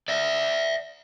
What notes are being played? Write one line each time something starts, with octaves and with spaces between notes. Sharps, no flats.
D5 E5